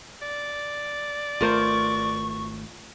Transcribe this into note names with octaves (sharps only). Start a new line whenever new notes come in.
D5
G#1 A3 F4 A#4 C5 C#6